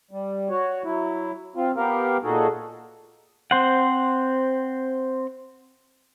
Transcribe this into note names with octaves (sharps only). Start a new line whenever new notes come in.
G3
F#4 C#5
F#3 E4
C4 F4
B3 G4 A#4 F5
A#2 D#4 F#4 G#4 A4
C4 C5 F#5